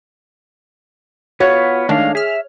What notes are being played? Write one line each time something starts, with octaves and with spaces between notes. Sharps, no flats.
B3 F4 F#4 C#5
D#3 G#3 A3 D4 F5
G#4 E5 F6